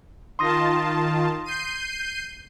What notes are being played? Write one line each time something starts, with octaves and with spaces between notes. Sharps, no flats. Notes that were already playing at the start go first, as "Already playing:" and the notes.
D#3 F4 A5 C6 D#6 A#6
G6 C7 D#7